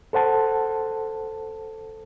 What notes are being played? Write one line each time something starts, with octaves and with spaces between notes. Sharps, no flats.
A4 C5 F#5 A5